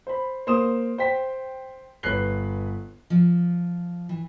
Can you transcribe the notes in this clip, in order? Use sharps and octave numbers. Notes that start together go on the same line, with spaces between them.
C5 B5
A#3 C5 C6 D#6 E7
C5 G5 B6
G1 B4 C#5 F#6 C7 G7
F3
E3